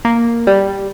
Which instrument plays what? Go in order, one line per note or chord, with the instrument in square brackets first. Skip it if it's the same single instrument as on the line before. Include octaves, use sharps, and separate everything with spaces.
[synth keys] A#3
G3